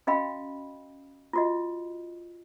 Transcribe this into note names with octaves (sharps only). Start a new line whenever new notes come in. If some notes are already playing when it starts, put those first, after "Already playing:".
C#4 F#4 D#5 F5 G5 B5
F4 F#4 D#5